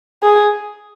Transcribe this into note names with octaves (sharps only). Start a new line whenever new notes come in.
G#4